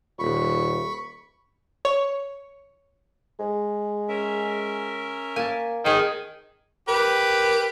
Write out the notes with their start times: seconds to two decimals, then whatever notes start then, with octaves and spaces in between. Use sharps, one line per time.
0.19 D#1 B5 C#6
1.85 C#5
3.39 G#3
4.09 C#4 A#4 E5
5.36 A#3 G#5 A5
5.85 D#3 C4 G#4
6.88 G4 A#4 B4